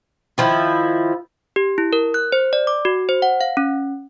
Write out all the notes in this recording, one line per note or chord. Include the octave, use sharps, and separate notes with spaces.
D#3 F3 E4
G4
E4
A#4
F#6
C5
D5
D6
F#4
C5
F#5
F5
C#4